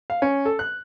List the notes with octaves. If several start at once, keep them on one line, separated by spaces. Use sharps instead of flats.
F5
C#4
A4
F#6